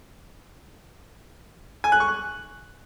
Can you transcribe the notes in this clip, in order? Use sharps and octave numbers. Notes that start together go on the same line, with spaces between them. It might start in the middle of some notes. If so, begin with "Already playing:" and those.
G#5
F#6
C#6
F#6